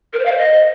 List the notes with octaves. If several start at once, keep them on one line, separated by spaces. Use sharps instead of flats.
A#4
C5
F5
C5
D#5